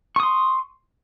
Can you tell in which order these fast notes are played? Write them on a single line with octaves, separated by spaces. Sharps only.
C#6 D#6 C6